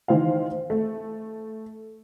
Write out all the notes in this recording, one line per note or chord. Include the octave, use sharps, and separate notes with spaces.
D#3 E3 C5 F5
A3